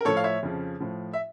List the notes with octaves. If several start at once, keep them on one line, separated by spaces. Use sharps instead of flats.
A#4
A2 F3 A4 C#5
F5
C#5 E5
F2 C#3 F3
A2 F3
E5